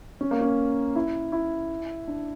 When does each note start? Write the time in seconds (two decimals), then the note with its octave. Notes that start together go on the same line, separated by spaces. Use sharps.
0.21 C#4
0.31 A#3
0.41 C#4
0.96 E4
1.32 E4
2.08 D4